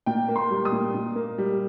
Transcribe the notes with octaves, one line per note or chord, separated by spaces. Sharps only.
A#2 G5
A#3
C6
G3
D#6
A#2
A#2
A#3
G3